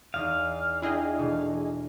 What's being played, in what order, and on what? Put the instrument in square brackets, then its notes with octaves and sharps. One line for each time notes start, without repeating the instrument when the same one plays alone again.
[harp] E2 D#4 D#6 [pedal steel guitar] F5
[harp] D4 G5 [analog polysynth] E4 G#4 D#5
[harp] B2 E3 A3